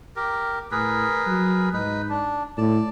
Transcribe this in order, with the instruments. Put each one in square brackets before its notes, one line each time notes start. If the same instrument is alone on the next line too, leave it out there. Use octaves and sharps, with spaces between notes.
[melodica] G4 A#4
[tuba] A2 [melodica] G#4 A#4 B4
[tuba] F#3
[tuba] G#2 [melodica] D#4 B4
[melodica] D4
[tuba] A2 [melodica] D5 A5